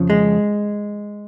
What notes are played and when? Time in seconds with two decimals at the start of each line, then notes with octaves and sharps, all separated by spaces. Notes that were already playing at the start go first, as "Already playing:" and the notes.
Already playing: F2 C#3 F3
0.10 G#3